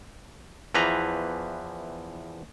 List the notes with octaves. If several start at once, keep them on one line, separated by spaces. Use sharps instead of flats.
E2 E3 F3 B4 A#5